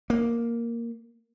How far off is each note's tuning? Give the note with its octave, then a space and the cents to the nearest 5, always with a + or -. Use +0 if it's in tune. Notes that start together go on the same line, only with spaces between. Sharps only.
A#3 +0